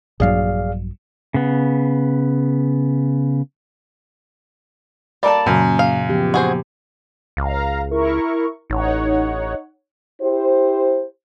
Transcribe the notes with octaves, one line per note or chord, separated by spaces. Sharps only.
A#1 G2 F#3 G#4 D5 F5
C#3 B3
G3 A#3 A4 D5 A5
F#2 A#2 C#3
F5
F3 B3 G4
F#4 G#4 C5
C#2 F5 A#5
E4 A#4 C#6
A1 D#4 C#5 F#5
E4 G4 C5